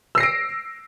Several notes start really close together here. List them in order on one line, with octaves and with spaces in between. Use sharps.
E6 C7 A#6 D7